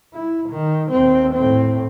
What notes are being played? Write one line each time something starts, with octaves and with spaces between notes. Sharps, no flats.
E4
D#3
D#2 C4
A2 C4